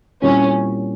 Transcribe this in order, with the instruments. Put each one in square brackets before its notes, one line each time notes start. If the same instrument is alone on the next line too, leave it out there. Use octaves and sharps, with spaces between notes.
[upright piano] A#2 G3 C4 E4 [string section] C#4